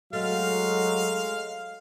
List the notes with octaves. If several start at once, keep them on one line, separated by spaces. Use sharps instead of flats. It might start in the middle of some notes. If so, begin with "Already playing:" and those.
F#3 G#3 A3 F5 F6